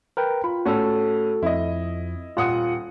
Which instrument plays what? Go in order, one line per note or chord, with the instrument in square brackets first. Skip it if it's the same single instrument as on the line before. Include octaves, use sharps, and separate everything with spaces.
[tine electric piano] A#4 B4 G5
[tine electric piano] F4 [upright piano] B5
[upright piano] A2 C#4 [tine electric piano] F#4 A4
[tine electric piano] F2 [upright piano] E4 D#5
[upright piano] D#1 F#5 D#6 [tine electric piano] F4